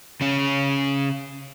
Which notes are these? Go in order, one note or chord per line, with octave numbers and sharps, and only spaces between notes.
C#3 C#4